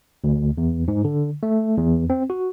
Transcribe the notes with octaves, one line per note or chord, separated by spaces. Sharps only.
D2
E2
G#2
D3
A3
E2
C4
F#4